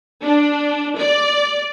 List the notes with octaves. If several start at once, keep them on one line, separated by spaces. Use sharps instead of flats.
D4
D5